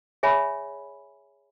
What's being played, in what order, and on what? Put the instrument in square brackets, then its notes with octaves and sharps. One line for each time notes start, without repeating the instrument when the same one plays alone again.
[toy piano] G#4 C#5 E5 G#5 B5